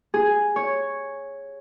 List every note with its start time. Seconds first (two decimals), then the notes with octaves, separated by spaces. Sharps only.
0.14 G#4
0.56 C#5